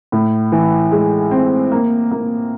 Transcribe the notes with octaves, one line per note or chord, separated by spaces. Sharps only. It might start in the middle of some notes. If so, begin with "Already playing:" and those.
A2
E3
G#3
C4
A#3
A#3